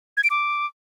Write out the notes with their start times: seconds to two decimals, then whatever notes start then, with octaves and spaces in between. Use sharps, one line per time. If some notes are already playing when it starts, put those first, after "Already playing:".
0.17 G#6
0.24 D7
0.30 D6